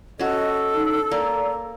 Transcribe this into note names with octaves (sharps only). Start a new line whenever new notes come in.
C#4 F#4 A4 D#5
D#4
A#3 D5